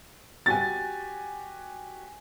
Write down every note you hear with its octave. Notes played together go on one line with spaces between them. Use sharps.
F#4 G4 G#5 A6